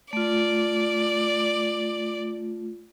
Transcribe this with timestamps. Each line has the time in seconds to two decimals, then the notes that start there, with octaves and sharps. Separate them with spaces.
0.13 A3 F4 D5